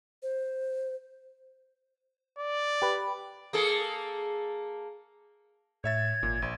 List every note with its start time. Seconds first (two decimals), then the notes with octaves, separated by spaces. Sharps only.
0.22 C5
2.39 D5
2.82 G4 B4
3.53 A#3 G#4 A4
5.84 A2 C#5 E5 G#6 A6
6.23 G#1 A#2
6.42 A#1